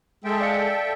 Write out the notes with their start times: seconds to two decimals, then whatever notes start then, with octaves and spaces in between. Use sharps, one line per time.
0.25 G#3 A4 E5 G5
0.41 D5 F5 C#7